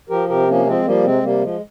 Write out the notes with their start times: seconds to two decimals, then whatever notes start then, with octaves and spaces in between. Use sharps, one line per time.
0.09 F3 G4 A#4
0.28 C3 G4 A#4
0.48 F3 A#3 C#4
0.66 F3 G#3 C4
0.85 F3 G3 A#3
1.04 C3 G#3 C4
1.23 C3 G3 A#3
1.42 F3 G#3